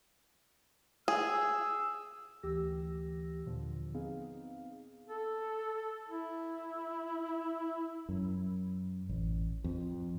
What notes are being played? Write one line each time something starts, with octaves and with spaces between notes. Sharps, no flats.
G#4 E6
D2 E3 G4 E6 A#6
D#2 A#2 D3 F3
B3 C4 D#4 G#4 F5
A4
E4
F#2
A1
F2